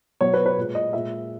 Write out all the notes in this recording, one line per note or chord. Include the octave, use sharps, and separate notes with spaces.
B2 F#3 C#5
B4
B4
A#2 G#3
D#5
A#2 G#3 E5